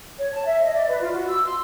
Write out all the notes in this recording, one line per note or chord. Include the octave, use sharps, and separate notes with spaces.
C#5
A5
E5
D#5
D5
B4
F4
F#4
E6
C6